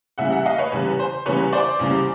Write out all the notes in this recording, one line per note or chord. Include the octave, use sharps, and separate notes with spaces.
E2 C#3 E3 G3 E5 F#5
E5 F#5
D#5 F5
B4 C#5
E2 C#3 E3 G3 B4
C5
E2 C#3 E3 G3 B4 C#5
C5 D5
E2 C#3 E3 G3